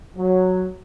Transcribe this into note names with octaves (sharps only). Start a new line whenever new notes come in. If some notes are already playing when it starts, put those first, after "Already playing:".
F#3